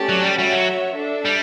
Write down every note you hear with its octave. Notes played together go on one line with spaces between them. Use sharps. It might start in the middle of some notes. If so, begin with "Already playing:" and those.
Already playing: A3 C#4 G4 D5 A5
F#3
G3
G3 F#4 C#5 E5
F#3
D4 A4 E5
G3